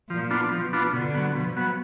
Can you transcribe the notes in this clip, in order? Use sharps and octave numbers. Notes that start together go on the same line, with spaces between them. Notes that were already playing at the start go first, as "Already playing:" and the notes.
A#2 F3
B3 D4 F4
B2 F3
B3 D4 F4
B2 D3
F#3 B3
B2 F3
F#3 B3